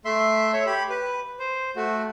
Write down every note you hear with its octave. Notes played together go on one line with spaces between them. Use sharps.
A3 E5 C6
C#5 E5
G4 B5
B4
C5
A3 F#4